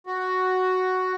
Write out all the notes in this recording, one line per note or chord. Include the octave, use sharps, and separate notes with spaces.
F#4